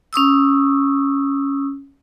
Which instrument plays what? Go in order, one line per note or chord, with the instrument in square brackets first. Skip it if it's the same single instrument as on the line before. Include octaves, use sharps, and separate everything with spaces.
[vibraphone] C#4 C#6 D#6 E6